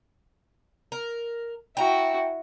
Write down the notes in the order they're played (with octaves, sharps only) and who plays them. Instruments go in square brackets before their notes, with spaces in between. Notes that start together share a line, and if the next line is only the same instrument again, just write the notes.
[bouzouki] A#4
[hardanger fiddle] E4 F#4 [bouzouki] G5 A#5